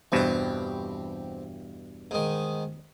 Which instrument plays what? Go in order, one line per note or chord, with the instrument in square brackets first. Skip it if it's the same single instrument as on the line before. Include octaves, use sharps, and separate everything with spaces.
[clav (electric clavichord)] E2 G2 B2 [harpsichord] C4 G4
[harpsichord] G#2 D#3